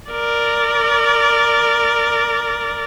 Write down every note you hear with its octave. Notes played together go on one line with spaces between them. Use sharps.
A#4 D5